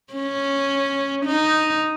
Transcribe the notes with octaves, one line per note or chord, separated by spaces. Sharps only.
C#4
D#4